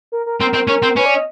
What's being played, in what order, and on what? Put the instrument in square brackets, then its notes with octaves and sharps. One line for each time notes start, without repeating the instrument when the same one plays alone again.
[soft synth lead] A#4
A#4
[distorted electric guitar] C4 [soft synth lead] A#4
[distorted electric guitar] C4
[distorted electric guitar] C#4 [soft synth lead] A#4
[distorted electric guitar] C4
[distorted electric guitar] C#4 [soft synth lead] B4
[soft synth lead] D5
D#5